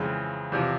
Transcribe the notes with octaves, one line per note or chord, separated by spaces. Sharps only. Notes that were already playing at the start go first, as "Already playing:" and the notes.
Already playing: F2 C#3 E3 G#3 C4
E2 C3 F3